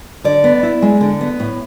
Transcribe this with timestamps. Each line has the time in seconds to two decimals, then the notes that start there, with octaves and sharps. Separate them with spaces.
0.24 D3 D5
0.44 B3
0.63 E4
0.82 G#3
1.01 D3
1.21 B3
1.40 A2